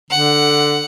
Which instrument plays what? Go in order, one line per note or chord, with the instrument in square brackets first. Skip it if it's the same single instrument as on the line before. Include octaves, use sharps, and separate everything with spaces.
[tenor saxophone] D3 [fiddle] F#5